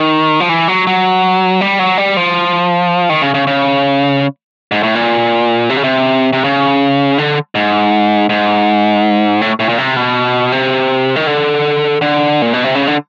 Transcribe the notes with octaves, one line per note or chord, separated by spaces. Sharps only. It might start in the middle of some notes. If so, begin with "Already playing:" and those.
Already playing: D#3
F3
E3
F#3
F#3
G3
F#3
G3
F3
D#3
C#3
C#3
C#3
G#2
A2
A#2
C3
C#3
C3
C3
C#3
D3
G#2
G#2
A2
A2
A#2
C3
B2
C3
D#3
D3
D3
A#2
B2
C3
C#3
D3